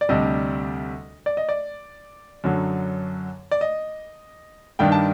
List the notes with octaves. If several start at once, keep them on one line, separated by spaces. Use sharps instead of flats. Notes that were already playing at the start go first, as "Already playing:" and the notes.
D5
D2 C3 G3 D4 D#5
D5
D#5
D5
F#2 D3 F#3
D5
D#5
G2 D#3 G3 D4 G5
A5